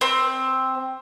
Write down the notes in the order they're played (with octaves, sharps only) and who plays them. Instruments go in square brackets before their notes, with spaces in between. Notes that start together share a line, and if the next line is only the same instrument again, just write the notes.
[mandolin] C4